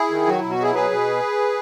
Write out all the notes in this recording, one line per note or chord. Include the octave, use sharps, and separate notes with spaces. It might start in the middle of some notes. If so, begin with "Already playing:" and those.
Already playing: E4 G#4
D#3
F#3 F#4
B2 E4
F#4
F#3 E4 G#4
B2 G#4 B4
B2